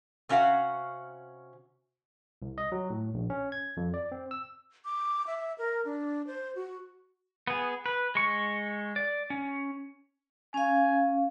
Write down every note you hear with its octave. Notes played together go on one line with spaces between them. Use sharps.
C3 C#4 F#4 F5 F#5
C2
D#5
F#3
A2
A#1
C#4
G#6
F2
D5
C4
E6
D6
E5
A#4
D4
C5
F#4
B3 G#4
B4
G#3 C#6
D5
C#4
C#4 F5 G#5